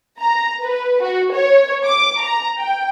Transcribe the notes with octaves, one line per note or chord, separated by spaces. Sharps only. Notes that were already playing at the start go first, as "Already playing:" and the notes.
A#5
B4
F#4
C#5
D6
A#5
G5